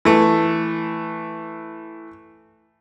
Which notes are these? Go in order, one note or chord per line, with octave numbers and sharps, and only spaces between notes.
E3 A3